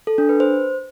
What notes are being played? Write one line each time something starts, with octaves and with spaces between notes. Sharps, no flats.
A4
D4
B4
C5